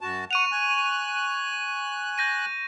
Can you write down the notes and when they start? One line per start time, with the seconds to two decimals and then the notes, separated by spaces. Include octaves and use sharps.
0.01 F#2 F#4 A5
0.31 F#5 C#6 D#7 F7
0.52 G#5 F#6
2.18 G6 A#6 D#7